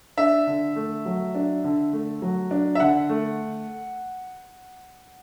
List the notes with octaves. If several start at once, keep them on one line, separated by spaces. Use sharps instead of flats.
D4 E5
D3
A3
F#3
D4
D3
A3
F#3
D4
E5
D3 F#5
A3